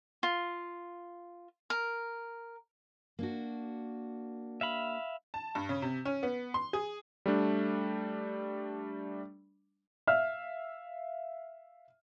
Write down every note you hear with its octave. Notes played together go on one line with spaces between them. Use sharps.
F4
A#4
A#3 D4 F#4
E5 F5 B5
A5
G2
C#3
C3
C#4
B3
C6
G#4
G3 A3 D4
E5 F5 F6